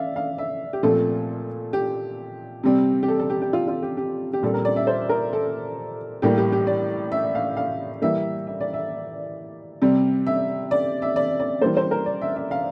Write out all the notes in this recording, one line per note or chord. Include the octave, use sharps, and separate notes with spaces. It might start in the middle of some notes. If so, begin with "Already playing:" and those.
Already playing: D5 E5 F5
F5
E5
G4
A#2 F3 A3 C4 A4
G4
C3 G3 C4
G4
A4
A4
G4
G4
F4
F4
G4
G4
G4
A#2 G3 C4 A4
A#4
D5
E5
C5
A#4
A4
A2 G3 A#3 G4
G4
G4
D5
E5
F5
F5
E3 G3 A#3 E5
E5
D5
E5
C3 G3 C4
E5
D5
E5
D5
D5
E3 G3 A#3 C5
C5
A#4
D5
E5
E5
F5